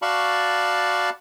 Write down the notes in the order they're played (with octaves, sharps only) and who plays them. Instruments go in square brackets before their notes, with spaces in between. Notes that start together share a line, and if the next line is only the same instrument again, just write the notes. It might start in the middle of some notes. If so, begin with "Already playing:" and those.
[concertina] F#4 D5 F5 A5 B5 C#6